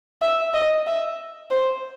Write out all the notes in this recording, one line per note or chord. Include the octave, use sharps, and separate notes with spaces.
E5
D#5
E5
C5